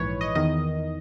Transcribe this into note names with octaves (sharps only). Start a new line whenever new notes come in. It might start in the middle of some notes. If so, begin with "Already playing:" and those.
Already playing: A#1 G#2 E3 B4 C#5
D#5
E2 D#3 D#5